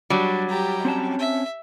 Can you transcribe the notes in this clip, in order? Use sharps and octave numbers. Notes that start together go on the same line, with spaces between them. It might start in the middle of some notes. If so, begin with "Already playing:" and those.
F#3 G3 D4
G4 A#5
C4 C#4 A5
E5